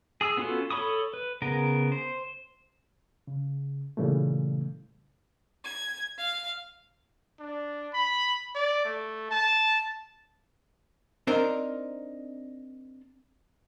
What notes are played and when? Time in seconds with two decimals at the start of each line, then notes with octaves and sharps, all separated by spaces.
0.21 G#4 D#6 E6
0.37 B3 C#4 F4 F#4 A4
0.71 A4 C#5 B5 C#6 D#6
1.14 B4
1.42 C#3 B3 A#4
1.92 C5
3.27 C#3
3.97 A#2 C#3 E3 G3 A3
5.63 G#6
6.17 F5
7.40 D4
7.93 B5
8.55 D5
8.85 A3
9.31 A5
11.27 C4 D4 D#4 A#4 C5 D5